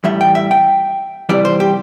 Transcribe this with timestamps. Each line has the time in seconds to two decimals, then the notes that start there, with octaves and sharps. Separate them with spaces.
0.04 A2 E3 G3 E5
0.21 G5
0.35 E5
0.51 G5
1.29 C3 E3 G3 D5
1.45 C5
1.60 G4